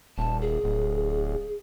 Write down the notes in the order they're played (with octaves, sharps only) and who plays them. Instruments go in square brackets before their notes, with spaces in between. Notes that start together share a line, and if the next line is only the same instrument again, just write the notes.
[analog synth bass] D#1 [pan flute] A5
[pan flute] G#4
[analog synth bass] D1